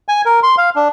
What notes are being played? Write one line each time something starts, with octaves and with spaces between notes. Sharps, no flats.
G#5
A#4
C6
F5
D4